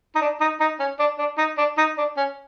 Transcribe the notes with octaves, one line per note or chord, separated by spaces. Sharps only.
D#4
D4
D#4
D#4
C#4
D4
D4
D#4
D4
D#4
D4
C#4